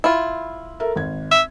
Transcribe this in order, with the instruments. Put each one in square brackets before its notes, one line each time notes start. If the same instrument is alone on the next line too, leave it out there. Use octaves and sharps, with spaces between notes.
[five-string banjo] E4 F4
[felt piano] A4 A#4 E5
G#1 G#6
[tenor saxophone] E5